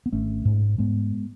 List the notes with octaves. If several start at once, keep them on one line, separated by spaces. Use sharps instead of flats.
B3
G#1 A3 C#4
G#2
G#2 G#3 B3